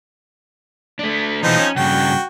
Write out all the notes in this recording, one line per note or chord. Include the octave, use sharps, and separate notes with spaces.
A3 D4
B2 E3 F3 C4 D#4
C#4
G2 C#3 F#4 G5